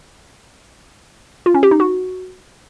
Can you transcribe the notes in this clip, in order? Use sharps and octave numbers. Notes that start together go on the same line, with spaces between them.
F4
C#4
G4
D#4
F#4